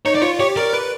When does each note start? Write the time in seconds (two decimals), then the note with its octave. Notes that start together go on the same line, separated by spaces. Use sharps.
0.05 D#4 C#5
0.15 D5
0.22 F4 C#5
0.40 G4 C#5
0.56 A#4 D5
0.73 B4